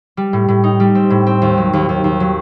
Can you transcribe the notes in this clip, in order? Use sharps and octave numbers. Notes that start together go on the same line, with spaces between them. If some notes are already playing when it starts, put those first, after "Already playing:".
G3
A2
A2
D#4
G3
C4
A2
C4
D#2
F#3
D#2
D#2
D#2
F#3